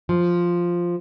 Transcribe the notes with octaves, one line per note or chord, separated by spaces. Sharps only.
F3